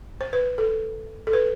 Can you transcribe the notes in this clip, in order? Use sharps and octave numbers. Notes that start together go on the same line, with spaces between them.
C5
B4
A4
A4
B4